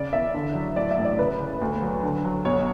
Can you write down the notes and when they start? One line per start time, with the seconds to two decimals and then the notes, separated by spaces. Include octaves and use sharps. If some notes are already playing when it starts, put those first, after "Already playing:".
Already playing: C#3 D5
0.13 E2 E5
0.34 D3
0.55 F#3
0.76 A2 D5
0.91 E5
0.97 A1
1.05 D5
1.19 C#3 B4
1.40 C#3
1.62 D2
1.82 F#3
2.03 D3
2.25 F#3
2.45 B1 C#5